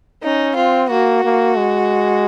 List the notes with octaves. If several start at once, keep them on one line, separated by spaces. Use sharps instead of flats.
C#4 D#4
C4 F4
A#3 F#4
A#3
G#3